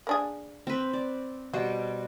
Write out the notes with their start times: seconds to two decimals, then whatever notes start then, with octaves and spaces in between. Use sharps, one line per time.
0.07 A#3 D4 G#4
0.67 C4 B4
0.93 D5
1.53 B2 G3 F#4 C5